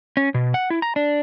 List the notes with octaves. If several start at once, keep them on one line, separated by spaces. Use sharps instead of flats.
C#4
B2
F#5
E4
A#5
D4